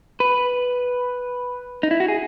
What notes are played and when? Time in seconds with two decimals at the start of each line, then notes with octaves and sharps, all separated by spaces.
0.20 B4
1.83 D#4
1.91 E4
2.00 F#4
2.08 G#4